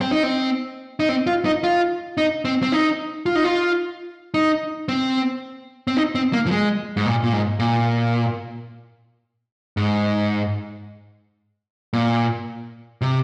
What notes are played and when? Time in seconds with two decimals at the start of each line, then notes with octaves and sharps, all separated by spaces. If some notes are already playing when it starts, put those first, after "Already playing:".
0.01 C4
0.12 D#4
0.23 C4
1.00 D#4
1.09 C4
1.27 F4
1.45 D#4
1.64 F4
2.17 D#4
2.45 C4
2.63 C4
2.72 D#4
3.26 F4
3.35 D#4
3.44 F4
4.34 D#4
4.89 C4
5.87 C4
5.97 D#4
6.15 C4
6.33 A#3
6.47 F3
6.51 G#3
6.97 G#2
7.06 A#2
7.23 A#2
7.33 G#2
7.59 A#2
9.77 G#2
11.93 A#2
13.02 C3